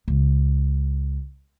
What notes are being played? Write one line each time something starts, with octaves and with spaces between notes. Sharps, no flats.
C#2